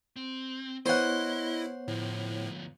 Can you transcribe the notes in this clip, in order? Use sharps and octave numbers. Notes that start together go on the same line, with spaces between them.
C4
B3 E4 C5 C#5 D#5 F#5
D2 A2 F3